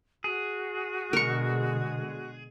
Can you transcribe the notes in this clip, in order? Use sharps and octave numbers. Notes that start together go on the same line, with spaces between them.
F#4 G#4
B2 D3 G#3 A#4 C#6